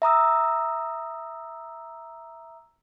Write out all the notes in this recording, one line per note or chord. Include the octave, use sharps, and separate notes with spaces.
E5 A#5 D#6 E6